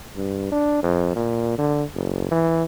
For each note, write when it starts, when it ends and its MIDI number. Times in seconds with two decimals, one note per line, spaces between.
0.16 0.49 43
0.52 0.81 62
0.83 1.15 41
1.16 1.54 46
1.58 1.84 50
1.95 2.28 30
2.31 2.63 52